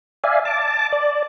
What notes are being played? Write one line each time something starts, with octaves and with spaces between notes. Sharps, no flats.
D5 E5 F5 G#5
A5 D6
D5